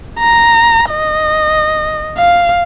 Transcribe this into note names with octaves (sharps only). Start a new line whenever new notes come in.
A#5
D#5
F5